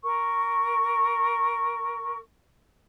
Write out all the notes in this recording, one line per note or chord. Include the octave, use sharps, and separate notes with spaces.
A#4 C#6